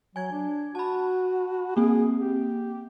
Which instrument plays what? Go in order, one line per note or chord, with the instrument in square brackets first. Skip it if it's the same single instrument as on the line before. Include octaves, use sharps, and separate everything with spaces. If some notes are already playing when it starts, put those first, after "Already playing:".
[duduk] F#3 [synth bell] G#5 G#6
[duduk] D4
[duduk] F#4 [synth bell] A5 B5
[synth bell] A#3 C4 [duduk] G#4
[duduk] G4